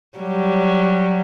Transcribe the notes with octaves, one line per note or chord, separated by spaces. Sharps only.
F#3 G3